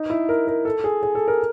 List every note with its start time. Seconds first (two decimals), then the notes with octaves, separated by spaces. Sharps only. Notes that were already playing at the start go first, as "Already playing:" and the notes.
Already playing: D#4
0.10 E4
0.29 A#4
0.47 A#4
0.65 A4
0.84 G#4
1.03 G#4
1.15 A4
1.28 A#4